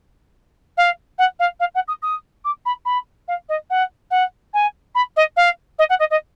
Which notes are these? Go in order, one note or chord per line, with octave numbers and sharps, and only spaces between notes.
F5
F#5
F5
F5
F#5
D#6
D#6
D6
B5
B5
F5
D#5
F#5
F#5
G#5
B5
D#5
F5
D#5
F#5
D#5
D#5